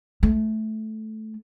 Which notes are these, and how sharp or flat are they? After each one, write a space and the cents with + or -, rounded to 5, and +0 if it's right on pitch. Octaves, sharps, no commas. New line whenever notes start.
A3 -10